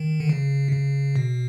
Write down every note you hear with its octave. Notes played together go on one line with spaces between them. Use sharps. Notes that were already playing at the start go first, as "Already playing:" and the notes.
Already playing: D#3
D3
C#3
C3
C#3
B2